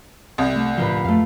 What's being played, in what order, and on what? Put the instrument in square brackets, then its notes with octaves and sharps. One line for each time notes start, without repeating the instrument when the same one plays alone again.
[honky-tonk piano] C2
[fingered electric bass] A3
[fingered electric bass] A2 D3 F3 [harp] F4 A#4 B4
[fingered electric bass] F2 [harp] A3 F5